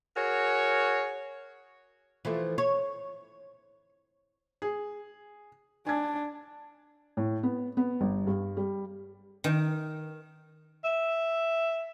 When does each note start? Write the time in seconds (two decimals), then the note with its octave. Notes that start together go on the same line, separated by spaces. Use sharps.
0.16 F#4 G#4 A#4 C#5
2.25 E3 F3 A3
2.58 C#5
4.62 G#4
5.87 D4 G#5 G#6
7.17 A2
7.43 B3
7.77 B3
8.01 G1
8.27 G2
8.57 G3
9.44 D#3
10.84 E5